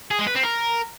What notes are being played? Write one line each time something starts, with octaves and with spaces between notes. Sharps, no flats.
G#4
G#3
B4
C4
A#4